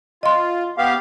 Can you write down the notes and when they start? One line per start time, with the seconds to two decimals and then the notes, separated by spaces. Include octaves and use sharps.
0.23 F4 D#5 C6
0.78 B3 G4 F5